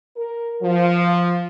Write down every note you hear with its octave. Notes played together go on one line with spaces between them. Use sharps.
A#4
F3